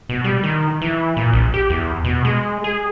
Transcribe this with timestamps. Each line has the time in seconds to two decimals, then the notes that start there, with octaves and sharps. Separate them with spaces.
0.09 B2
0.24 G3
0.44 D#3
0.81 E3
1.17 A#2
1.33 A#1
1.54 G4
1.70 E2
2.04 B2
2.25 G#3
2.64 G#4